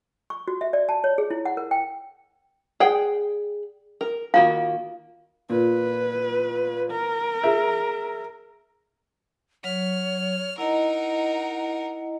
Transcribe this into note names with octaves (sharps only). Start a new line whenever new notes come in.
C#6
F#4
E5
D5
A5
C#5
G#4
E4
F#5
A#4
G5
G#4 D5 F#5 G5
A#4
D#3 A#3 F4 F#4 F5
A#2 B4
A#4
G#4 E5
F#3 C#5 F6
D#4 E4 A#4 D#5 F#5 A#5